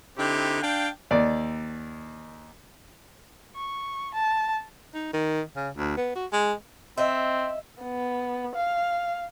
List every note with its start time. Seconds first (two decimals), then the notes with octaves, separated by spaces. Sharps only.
0.18 D3 C4 D#4 E4 G4
0.62 D4 F5 G5
1.11 D#2 D5
3.55 C#6
4.14 A5
4.94 D#4
5.13 D#3
5.56 C#3
5.77 D2
5.97 B3
6.15 F#4
6.32 G#3
6.98 C4 D#5 E5
7.82 B3
8.55 F5